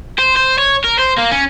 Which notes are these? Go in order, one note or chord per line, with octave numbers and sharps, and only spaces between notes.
C5
C5
C#5
A#4
C5
A#3
C#4